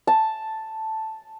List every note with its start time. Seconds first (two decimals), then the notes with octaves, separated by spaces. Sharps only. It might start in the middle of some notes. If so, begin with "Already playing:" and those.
0.07 A5